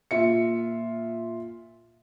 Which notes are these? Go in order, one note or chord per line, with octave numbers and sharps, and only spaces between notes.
A#2 F4 E5 C#7